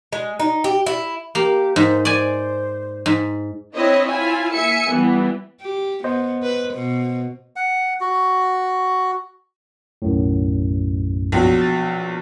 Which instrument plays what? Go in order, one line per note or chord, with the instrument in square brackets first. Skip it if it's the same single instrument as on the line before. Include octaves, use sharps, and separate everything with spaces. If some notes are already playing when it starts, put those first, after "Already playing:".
[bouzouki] G#3
D#4
G4
E4
[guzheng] A#3 [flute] G4
[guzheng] G#2 [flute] C5
[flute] C5 [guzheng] D5 G#5
[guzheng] G#2
[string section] C4 D4 E4 C#5 D#5
E4 F4 G#5
A#3 E5 G#5 C#7
E3 G3 B3
[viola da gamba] G4
[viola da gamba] B3 [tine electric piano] C5 D#5
[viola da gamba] B4
B2
[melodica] F#5
F#4
[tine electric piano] B1 F#2 A2
[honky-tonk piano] A#1 B2 F#3
[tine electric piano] A6